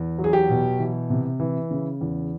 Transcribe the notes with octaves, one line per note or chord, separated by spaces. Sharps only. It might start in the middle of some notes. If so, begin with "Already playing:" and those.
Already playing: E2
F#3
G#4
G4
B2
E3
C3
E3
C#3
E2